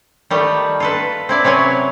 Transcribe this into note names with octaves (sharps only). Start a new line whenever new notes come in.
D#3 G3 A3
F4 A4 B4
C4 E4 D5
C3 F#3 C#4 B4 G#5